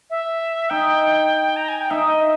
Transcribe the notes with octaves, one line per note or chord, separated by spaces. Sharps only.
E5
D#4 G5
A#5
G#5
G5
D#4 E5
D#5
E5